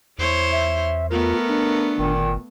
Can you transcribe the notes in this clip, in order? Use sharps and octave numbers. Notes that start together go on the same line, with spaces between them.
E2 E4 C5 C#5
E5
A3 B3 F4 A#4
D4
G1 A#2 D#3